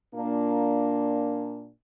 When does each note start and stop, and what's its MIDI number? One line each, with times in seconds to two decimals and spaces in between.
0.15 1.69 46
0.15 1.69 58
0.15 1.69 62